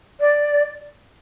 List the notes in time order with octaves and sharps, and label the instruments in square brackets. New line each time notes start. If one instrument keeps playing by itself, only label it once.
[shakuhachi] D5